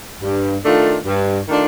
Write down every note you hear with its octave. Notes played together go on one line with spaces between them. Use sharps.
G2
D#3 A3 D4 F4
G2
D#3 A3 D4 F4